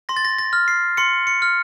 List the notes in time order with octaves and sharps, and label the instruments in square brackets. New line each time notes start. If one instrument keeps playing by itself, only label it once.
[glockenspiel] C6 A#6
A6
A#6
A#6
F6
C7
C6 C#7
C#7
F6